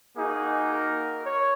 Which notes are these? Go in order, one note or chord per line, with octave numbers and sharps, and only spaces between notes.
A#3 D#4 F#4 G#4
A#4
C#5